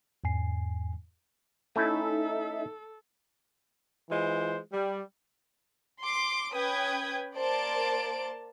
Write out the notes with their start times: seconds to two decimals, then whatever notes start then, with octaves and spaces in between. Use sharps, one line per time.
0.24 E2 G#2 G#5 C7
1.76 A3 C#4 D#4 E4 A4 E5
4.09 E3 G#3 F4 C5
4.72 G3
6.00 C6 D6
6.53 C#4 B4 G5 D#6 G#6
7.36 A#3 C5 D5 A5 D7